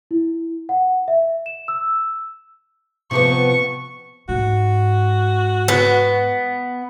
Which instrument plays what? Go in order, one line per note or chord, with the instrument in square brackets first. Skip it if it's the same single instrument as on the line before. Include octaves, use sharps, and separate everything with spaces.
[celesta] E4
F#5
E5
E7
E6
[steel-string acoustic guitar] C3 F3 B3 [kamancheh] C#6
[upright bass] G#2 [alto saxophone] F#4
[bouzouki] B3